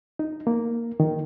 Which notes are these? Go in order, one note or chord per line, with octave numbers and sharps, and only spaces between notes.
D#4
A#3
D#3